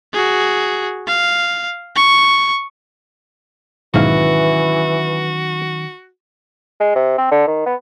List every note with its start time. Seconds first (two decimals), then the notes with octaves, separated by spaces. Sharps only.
0.14 F#4 G#4
1.07 F5
1.96 C#6
3.94 B1 G#2 D#3 E3 F#3 C#4 F#4 F5
6.80 G#3
6.95 C3
7.18 C4
7.31 D3
7.47 D#3
7.66 B3